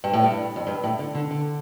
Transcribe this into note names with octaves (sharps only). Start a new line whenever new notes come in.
G2
A2
G2
F2
G2
A2
D3
D3
D3